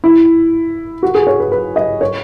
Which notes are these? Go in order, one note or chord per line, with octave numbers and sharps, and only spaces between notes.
E4
F#4
G#4
C#5
B4
B4
D#5
C#5